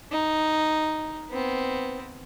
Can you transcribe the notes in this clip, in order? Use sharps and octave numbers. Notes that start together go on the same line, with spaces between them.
D#4
B3 C4